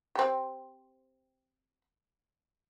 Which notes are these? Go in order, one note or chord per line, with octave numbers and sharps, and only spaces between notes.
C4 G4